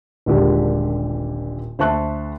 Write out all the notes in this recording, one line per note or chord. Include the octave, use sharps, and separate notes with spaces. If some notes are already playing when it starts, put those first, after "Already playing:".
D#1 A#1 D3 G#3 G4 A#4
D2 C5 E5 A5 C#6 F#6